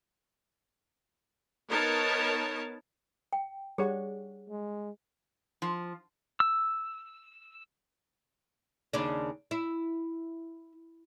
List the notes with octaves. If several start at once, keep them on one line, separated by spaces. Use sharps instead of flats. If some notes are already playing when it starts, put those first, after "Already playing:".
B3 D#4 A#4 C#5 A5
G5
G3 G#4 C#5 F#5
G#3
F3
E6
D#2 C#3 D4
E4